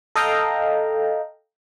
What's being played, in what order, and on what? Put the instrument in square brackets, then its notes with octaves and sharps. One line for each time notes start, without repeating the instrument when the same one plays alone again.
[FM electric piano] A4 D#5 F5 G5 A#5